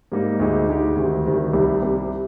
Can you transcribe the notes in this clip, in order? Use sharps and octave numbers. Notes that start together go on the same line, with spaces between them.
G#2 G3 A#3 D#4
D2 D3 G#3 D#4 G4
D2 D3 G#3 D#4 G4
D2 C3 D#3 G3
D2 C3 D#3 G3
C2 C3 G3
C2 C3 G3